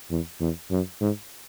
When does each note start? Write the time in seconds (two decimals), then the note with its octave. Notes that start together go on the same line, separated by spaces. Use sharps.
0.11 E2
0.41 E2
0.71 F#2
1.01 G#2